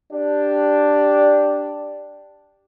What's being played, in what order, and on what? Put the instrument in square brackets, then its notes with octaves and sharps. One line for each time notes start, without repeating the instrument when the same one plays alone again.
[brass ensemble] D4 G4 D5